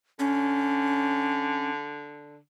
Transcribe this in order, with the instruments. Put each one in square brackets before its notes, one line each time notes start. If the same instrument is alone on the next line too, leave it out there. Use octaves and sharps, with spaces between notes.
[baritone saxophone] D3 [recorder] C#4